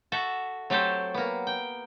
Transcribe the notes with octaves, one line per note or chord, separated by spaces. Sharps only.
F#4 A4 E5
F#3 A3 C4 G4 A4 C5
A#3 B3
G5